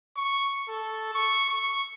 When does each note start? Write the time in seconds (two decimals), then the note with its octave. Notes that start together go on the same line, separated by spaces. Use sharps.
0.17 C#6
0.69 A4
1.14 C#6
1.50 C#6